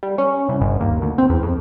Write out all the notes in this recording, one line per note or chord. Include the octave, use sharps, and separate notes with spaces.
G3
C#4
C2
G1
D#2
D2
C4
E2
F2